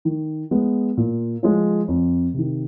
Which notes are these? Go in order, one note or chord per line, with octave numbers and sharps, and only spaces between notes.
D#3
G#3 B3
A#2
F3 G#3
F2
C3 D#3